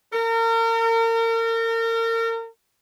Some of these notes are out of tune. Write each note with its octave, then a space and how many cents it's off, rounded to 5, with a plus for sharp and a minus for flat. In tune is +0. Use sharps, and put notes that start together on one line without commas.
A#4 -35